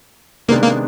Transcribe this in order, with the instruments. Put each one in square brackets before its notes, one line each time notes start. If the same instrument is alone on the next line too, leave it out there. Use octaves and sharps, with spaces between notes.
[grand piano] C3 D#3 G#3 B3 D4 [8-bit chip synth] A#3
[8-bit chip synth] A#3